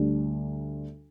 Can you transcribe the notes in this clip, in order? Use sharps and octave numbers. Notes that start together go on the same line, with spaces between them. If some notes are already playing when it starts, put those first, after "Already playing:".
Already playing: D2 D3 G3 D4